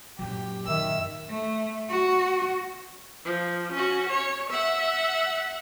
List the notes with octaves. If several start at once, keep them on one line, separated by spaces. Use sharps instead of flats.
F#2 A#2 F#3 G4
D#3 E5 E6
A3
F#4
F3
C#4 F#4
C#5
E5 F#5